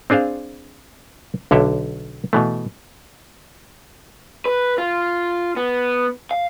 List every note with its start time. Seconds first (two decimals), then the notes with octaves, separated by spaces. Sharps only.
0.10 C4 D4 G#4 C5 F5
1.51 B1 D3 C#5 E5 G5
2.33 B2 E3 A3
4.46 B4
4.78 F4
5.56 B3
6.31 F5